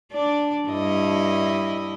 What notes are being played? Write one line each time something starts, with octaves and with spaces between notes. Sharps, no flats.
D4 D5
G2 E4 D#5